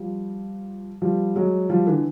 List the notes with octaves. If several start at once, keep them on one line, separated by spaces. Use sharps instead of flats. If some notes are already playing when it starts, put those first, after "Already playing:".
Already playing: F3 G3
F3 G3
F#3 G#3
F3 G3
D3 E3